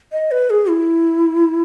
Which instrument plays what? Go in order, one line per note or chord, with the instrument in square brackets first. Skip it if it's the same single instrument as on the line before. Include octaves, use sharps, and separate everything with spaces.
[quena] D#5
B4
G#4
E4